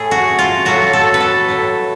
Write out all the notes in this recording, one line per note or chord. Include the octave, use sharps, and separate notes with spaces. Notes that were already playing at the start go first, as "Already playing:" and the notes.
Already playing: A2 A3 G#4
F#4
F4
A2 F#3 A3 F#4
A4
B4
A4
A2 F#3 A3